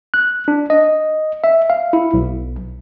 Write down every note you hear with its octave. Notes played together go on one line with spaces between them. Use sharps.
F#6
D4
D#5
E5
F5
E4
B1